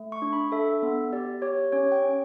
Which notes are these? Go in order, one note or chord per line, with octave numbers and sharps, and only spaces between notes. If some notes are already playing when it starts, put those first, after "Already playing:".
Already playing: A3
C#6
D4
B5
A4 E5
B3
G4 D5
G4 C#5
C#4 C#5
G5
C#4